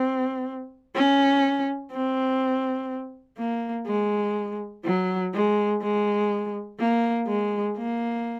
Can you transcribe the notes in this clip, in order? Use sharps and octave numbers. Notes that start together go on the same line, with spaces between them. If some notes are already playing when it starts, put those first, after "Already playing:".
Already playing: C4
C#4
C4
A#3
G#3
F#3
G#3
G#3
A#3
G#3
A#3